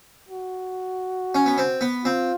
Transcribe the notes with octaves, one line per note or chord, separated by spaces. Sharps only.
F#4
C#4
B3
C4
B3
C4 F4